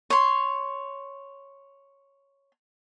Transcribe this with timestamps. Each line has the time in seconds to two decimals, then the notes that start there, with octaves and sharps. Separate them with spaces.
0.10 C#5 C6